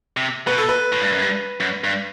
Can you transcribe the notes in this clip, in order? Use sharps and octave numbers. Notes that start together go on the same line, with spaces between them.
C3
B2 B4
A4
B4
A2
G2
F#2
G2
F#2
G2